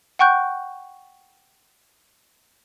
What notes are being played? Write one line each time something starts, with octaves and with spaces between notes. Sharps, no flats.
F#5 G5 C#6 F#6 G6